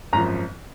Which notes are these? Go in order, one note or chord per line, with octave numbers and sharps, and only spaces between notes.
G#1 F#2 F3 A#5